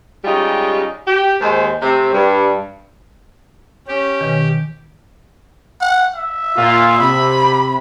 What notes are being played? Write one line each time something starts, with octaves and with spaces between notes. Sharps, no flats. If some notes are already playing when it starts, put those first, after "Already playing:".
G3 G#3 C#4 D#4 F4 G4
G4
D#2 G#3 C5
C3 A3 C4
G2 G3
C#4 G4
B2 D#3
F#5
E5
A#2 F4
C3 B5